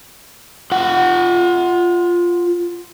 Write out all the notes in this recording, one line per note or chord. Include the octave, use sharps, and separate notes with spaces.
F4 F#5